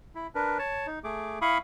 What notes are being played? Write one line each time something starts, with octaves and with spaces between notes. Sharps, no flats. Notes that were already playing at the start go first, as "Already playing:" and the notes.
E4
D4 A#4 B4
C#5 A5
D#4
A3 G#4 D6
E4 F5 B5 C#6 D#6